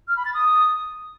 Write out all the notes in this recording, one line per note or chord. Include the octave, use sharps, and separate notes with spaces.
F6
B5
A6
D#6